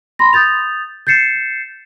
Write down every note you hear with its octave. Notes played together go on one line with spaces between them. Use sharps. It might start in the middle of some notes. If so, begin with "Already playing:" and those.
B5 C6 A#6
D#6 G6 A6 F7
G6 A6 C7 C#7 E7